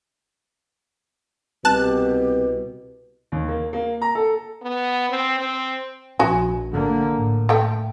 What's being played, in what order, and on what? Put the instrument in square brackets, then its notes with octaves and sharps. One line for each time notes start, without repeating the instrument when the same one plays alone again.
[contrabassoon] C2 [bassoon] B2 [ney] G4 [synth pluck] A5 F#6
[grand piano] D#2
A#3
A#3
A#5
A4
[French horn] B3
C4
C4
[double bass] A#1 [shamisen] F#4 G#5
[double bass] D3 A#3
A2
[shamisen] A3 G5